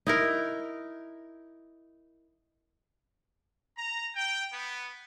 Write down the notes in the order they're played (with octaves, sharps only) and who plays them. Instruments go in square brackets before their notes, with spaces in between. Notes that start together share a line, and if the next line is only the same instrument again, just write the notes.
[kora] D#4 E4 A#4
[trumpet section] A#5
G5
B3